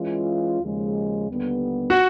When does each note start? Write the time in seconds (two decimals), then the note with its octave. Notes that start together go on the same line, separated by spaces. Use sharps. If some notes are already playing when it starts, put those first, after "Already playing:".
Already playing: E3 G#3 C#4 F4
0.61 D#2 C#3 F3 G#3
1.29 D#2 D3 G3 B3
1.90 F#4